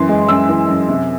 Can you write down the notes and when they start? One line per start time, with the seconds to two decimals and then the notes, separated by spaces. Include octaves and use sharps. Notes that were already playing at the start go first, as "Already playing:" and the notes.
Already playing: F#2 E3 C6
0.08 G#3
0.28 F#2 E6
0.49 E3
0.69 F#2
0.88 C3